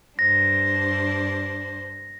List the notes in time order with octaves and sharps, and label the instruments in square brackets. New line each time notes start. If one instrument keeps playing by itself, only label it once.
[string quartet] G2 D4 C5 [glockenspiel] A#6